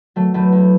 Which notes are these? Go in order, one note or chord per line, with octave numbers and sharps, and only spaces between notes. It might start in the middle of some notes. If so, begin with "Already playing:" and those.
F#3 A3
E2 A3
E2